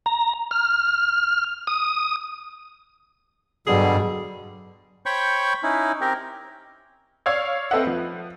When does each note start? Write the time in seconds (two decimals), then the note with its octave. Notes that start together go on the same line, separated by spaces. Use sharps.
0.06 A#5
0.51 F6
1.67 D#6
3.67 G2 B2 D3 F#3 G3 G#4
5.06 C5 C#5 G5 B5 C#6
5.63 C#4 D#4 E4
6.01 C4 G4 A#4
7.26 C#5 D5 F5 E6 G#6
7.71 C4 A4 B4 D#5 E5 F#5
7.83 F3 B4